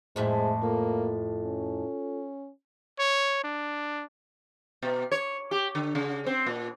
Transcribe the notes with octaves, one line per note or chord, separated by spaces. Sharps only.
F2 A2 G#3 C5 E5
A#3 F4 A4
C#4
C#5
D4
B2
C#5
G4
D3
C#3
C4
A#2